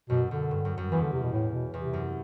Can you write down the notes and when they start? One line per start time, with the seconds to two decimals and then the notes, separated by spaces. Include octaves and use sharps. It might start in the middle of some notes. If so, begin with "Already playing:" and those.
0.10 F#2 B2
0.30 F#2 D3
0.51 G2
0.65 F#2
0.78 F#2
0.92 E2 E3
1.02 D3
1.12 C3
1.22 B2
1.33 A2
1.53 B2
1.74 E2 C3
1.93 F#2